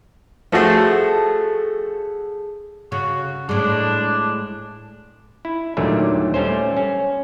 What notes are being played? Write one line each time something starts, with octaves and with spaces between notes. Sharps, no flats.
F3 A3 F#4 G#4 A4
C#3 F#4
A2 G#3 D4
E4
D#2 A#2 D3 F#3 G3 A3
G3 A3 C#4 C5
C#4